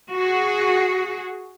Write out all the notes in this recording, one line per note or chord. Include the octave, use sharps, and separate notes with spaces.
F#4 G#4